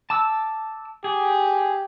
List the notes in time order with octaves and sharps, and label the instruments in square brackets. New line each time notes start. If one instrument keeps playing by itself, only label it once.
[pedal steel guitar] A5 D6 E6
[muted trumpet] G4 [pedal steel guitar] G#4